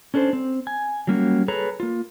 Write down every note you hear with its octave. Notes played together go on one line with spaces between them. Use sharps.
C#4 D4 A4 A#4 C5
C4
G#5
F#3 G3 A#3 C#4 E4 F#4
G#4 A4 B4 C#5 A#5
A#3 F4